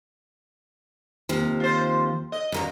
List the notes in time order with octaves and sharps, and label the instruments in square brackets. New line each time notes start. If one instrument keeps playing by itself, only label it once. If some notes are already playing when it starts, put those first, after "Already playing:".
[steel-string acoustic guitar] D#2 C3 F3
[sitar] F4 C5
D#5
[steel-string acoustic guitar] F#2 A#4 A#5 [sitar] A#2